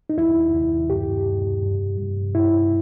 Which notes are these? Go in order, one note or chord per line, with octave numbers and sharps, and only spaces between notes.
D#4
D#2 E4
D#2
G2 G4
G2
G2
G2
G2 E4